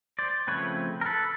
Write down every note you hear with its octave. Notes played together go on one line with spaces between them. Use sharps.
C5 D5
C#3 F3 A3 C4 B4 C#5
A#4
A4 B4